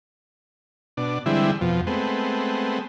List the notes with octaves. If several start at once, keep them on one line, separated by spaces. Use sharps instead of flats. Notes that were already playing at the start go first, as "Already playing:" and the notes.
B2 D4
D3 E3 G3 G#3 C4 E4
F2 B2 F3
G#3 A3 B3 C4